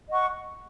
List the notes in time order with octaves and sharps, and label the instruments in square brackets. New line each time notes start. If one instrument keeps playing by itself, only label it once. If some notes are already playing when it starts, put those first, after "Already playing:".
[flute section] D#5 F#5 C#6